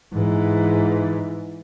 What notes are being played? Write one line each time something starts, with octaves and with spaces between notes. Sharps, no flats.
G#2 E3